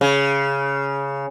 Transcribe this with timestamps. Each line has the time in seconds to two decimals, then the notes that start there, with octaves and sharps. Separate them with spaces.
0.01 C#3